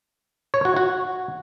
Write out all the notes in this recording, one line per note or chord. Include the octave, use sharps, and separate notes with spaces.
C#5
F#4
F#4